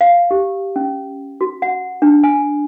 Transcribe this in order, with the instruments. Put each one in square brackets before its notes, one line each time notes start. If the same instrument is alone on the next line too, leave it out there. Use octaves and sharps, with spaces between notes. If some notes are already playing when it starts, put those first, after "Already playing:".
[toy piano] F5
G4
C#4
F#4
F#5
D4
G#5